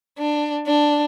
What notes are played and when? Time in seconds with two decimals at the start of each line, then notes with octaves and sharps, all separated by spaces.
0.18 D4
0.67 D4